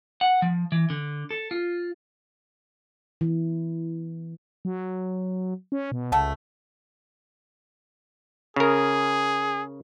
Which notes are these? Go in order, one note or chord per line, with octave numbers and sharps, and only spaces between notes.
F#5
F3
E3
D3
A4
F4
E3
F#3
C#4
B2
C#2 A3 F#5 A5
C#3 G#4 A#4